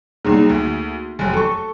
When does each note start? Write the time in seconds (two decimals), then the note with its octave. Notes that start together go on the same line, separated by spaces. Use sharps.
0.25 C2 F#3 A#3 D#4 G#4
0.50 D2
1.19 F1 F#2 G#5
1.33 A4 C#6